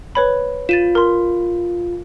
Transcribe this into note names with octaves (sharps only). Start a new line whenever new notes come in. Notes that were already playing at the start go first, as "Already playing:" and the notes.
B4 C#5 B5
F4 A6 D#7 E7
A#4 C6